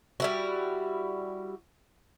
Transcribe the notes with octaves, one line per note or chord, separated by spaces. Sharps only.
G3 E4 F#4